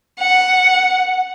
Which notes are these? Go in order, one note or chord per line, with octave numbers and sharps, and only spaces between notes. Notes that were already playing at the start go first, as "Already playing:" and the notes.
F#5